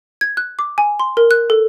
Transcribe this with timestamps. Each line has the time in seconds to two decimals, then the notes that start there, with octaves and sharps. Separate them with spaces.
0.21 G#6
0.37 F#6
0.59 D6
0.78 G#5
1.00 C6
1.17 A#4
1.31 F#6
1.50 A4